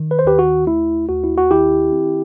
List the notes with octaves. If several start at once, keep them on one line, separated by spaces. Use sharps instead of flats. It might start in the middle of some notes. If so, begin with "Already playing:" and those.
Already playing: D#3
B4
C5
D#2 G4 B4
F#4
A3 E4
D#2 F#4
E4
F#4
D#3 E4 G4
C4